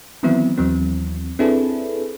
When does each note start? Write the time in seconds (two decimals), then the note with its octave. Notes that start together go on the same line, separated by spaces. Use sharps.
0.23 D#3 E3 F#3 B3 C4 E4
0.58 D#2 E3 F#3 C4
1.39 C4 D4 E4 G#4 A4 B4